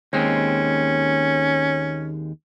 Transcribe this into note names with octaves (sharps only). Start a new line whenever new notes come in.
D#2 G#3 C4 C#4